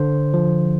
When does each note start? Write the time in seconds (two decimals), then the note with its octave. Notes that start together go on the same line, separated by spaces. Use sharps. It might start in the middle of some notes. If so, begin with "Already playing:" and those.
Already playing: D3 C5
0.34 F3